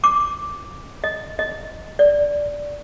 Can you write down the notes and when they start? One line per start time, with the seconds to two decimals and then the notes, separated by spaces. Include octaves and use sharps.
0.04 D6
1.04 D#5
1.39 D#5
1.99 D5